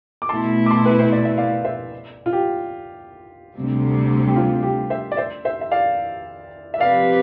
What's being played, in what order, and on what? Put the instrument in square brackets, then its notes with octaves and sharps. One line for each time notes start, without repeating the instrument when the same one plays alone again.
[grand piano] D6
[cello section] B2 A3 E4 [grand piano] A5 C6
[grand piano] D6
A5 C6
B4
C5
D5
E5
D5 F5
C5 E5
F4
G4
[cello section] D2 C3 G3 C4
[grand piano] G4
F4
G4
C5 E5
D5
C5 E5
C5 E5
E5
D5 F5
E5
[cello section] C3 F3 C4 G4 B4 [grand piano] D5 F5